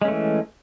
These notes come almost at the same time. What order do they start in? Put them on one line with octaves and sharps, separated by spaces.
G#3 C#4 A3 E3